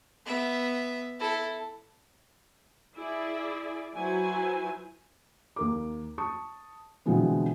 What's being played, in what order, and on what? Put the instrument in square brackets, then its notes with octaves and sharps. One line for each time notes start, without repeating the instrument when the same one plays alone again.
[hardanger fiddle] B3 E5
E4 A4
[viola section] E4 G#4 D5
F#3 E4 B4 C5 G#5
[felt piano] D#2 A#4 D6
A5 C#6 D#6
B2 D3 E3 F3 G#3 C4